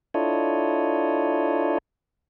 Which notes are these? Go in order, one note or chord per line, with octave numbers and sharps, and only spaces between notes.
D4 E4 F4 A4 C#5 D#5